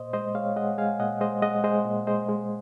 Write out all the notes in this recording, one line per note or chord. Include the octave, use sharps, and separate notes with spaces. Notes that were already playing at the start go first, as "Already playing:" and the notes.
Already playing: A#2 C5 D#5
G#3 C5 D#5
G#3 C#5 F5
G#3 D#5 F#5
G#3 F5 G#5
A#2 D#5 F#5
G#3 C5 D#5
G#3 D#5 F#5
G#3 C5 D#5
A#2
G#3 C5 D#5
G#3